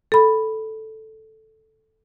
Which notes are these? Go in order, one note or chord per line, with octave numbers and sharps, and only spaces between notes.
A4 B5